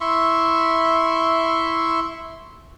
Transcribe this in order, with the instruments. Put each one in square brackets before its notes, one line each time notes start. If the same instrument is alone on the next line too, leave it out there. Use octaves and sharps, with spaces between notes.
[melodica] E4 E5 C6 C#6